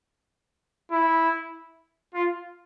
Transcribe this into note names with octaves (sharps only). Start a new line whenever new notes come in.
E4
F4